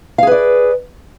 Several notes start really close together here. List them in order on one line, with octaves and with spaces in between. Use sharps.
F5 G#4 B4 D5